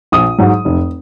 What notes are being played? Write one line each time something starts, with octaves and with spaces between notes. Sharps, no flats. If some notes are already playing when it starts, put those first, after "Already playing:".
A#1 D#6
G#2 F#3
F1